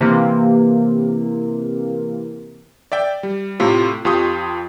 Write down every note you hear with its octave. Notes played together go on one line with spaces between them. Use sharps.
C3 E3 A#3
D5 E5 G5
G3
A2 C3 F4 A4
F2 F4 G4 G5 C#6 D#6